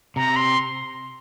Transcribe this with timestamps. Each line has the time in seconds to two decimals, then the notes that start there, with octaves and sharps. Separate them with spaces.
0.16 C3 A#5
0.36 C6